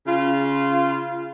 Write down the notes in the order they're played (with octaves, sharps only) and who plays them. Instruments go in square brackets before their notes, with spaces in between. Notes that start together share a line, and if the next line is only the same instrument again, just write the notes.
[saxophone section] C#3 F4